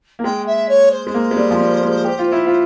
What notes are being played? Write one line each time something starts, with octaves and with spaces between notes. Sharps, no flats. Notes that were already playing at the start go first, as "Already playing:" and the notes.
A#3
G#3 G5
E5
C#5
C5
G#3
A#3
G#3
G3
F3
G3
G#3
G4
F4
E4
F4